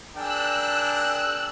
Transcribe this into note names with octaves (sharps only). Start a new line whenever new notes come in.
D4 G#4 A#4 G5 E6 F#6